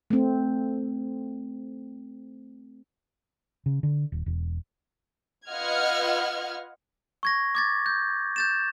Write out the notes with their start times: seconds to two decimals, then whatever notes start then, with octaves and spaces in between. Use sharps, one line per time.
0.10 A3 C4
3.66 C#3
3.83 D3
4.12 D#1
4.26 E1
5.49 F4 B4 D#5 F#5 F6 G#6
7.23 C#6 G#6 A#6
7.55 D6 G#6 A6
7.86 G6
8.36 G6 A6 E7